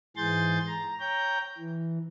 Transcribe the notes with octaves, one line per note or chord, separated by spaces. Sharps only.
G#2 E3 G#4 C6 G6 A6
A#5
C#5 G5 A#5 G6
E3